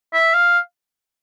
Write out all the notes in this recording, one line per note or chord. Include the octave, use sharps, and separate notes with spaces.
E5
F5